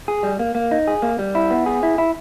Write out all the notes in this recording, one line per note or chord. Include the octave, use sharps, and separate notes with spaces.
G#4
G3
A#3
A#3
D#4
G#4
A#3
G3
E4
B3
G#4
E4
E4